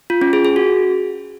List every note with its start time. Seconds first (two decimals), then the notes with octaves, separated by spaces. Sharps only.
0.10 F4
0.21 C#4
0.33 G#4
0.45 G#4
0.56 F#4